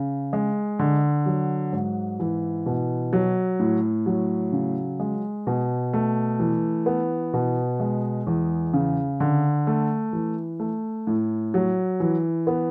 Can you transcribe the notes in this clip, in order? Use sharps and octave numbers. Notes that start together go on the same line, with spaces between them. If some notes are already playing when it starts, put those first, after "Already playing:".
Already playing: C#3
G#3
D3
F#3
G#2
E3
B2
F#3
A2
F#3
C#3
G#3
B2
A3
E3
B3
B2
G#3
E2
C#3
D3
A3
E3
A3
A2
F#3
E3
B3